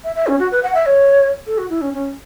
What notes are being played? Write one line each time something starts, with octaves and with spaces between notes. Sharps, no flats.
E5
E5
C#4
F#4
B4
F#5
E5
C#5
A4
F#4
E4
C#4
C#4